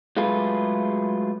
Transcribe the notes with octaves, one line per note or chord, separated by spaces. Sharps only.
F#3 G#3 A3 F4 G#4 B4